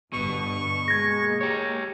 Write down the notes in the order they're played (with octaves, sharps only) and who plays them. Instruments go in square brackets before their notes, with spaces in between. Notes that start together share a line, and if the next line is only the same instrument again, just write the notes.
[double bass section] G1 G2 [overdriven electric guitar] B2 [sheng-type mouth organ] C#6
[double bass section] G#3 A#3 [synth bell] G#6 A#6
[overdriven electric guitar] G4 C#5